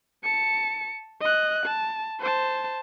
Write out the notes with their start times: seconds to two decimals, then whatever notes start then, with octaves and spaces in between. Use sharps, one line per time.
0.24 A5 C#7
1.21 D#5 F#6
1.66 A5
2.20 C5 A5